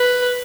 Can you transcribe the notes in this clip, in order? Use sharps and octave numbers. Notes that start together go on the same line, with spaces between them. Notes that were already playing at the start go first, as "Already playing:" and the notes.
Already playing: B4